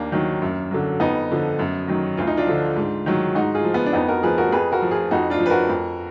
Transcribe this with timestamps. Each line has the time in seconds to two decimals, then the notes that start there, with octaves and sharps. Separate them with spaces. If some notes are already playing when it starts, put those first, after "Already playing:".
Already playing: D#2 A#3 D4
0.12 D#3 F#3
0.42 F#2
0.71 D3 F#3
1.00 F2 B3 D#4
1.30 D3 F3
1.59 F#2
1.88 D#3 F#3
2.17 D2 F4
2.27 D#4
2.37 D4 F4
2.47 D3 F3
2.76 G#2
3.06 D#3 F#3
3.35 G#2 D#4 F#4
3.55 F4 G#4
3.64 F3
3.74 B3
3.86 D4
3.93 F2 B3 D#4
4.08 F#4 A#4
4.23 F3 G#4 B4
4.38 F#4 A#4
4.52 F2 G#4 B4
4.72 F#4 A#4
4.82 F3
4.91 F4 G#4
5.11 F2 D#4 F#4
5.30 D4 F4
5.40 F3
5.46 B4
5.50 F#4 A#4
5.69 F2